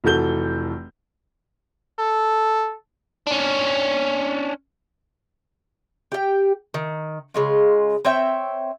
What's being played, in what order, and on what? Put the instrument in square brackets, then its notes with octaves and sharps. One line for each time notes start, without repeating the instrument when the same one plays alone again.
[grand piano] F1 E3 F#4 A4 G6 G7
[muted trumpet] A4
[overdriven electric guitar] C#4 D4
[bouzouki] G4 G5
D#3
C#3 G#3 F4
C4 C#5 E5 G5